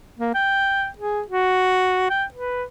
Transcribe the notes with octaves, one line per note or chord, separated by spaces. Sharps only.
A#3
G5
G#4
F#4
G5
B4